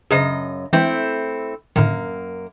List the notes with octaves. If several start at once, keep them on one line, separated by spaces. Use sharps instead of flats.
F#2 C#3 G#4 B4 C5 D#5
E3 G#3 A3 C4 E4
F#2 A2 D3 D#3 A#3